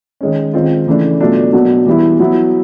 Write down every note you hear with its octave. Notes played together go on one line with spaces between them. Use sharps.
D#3 G#3 C#4
D#3 G#3 C4 F4
C#3 E3 A3 D4
B2 F#3 A3 D4 F4
B2 F#3 A#3 D4
E3 G3 B3 E4
F#3 B3 E4